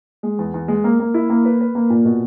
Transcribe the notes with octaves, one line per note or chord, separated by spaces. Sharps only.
G#3
E2
E2
G#3
A#3
A#3
E4
A#3
B4
B4
A#3
A#2
B2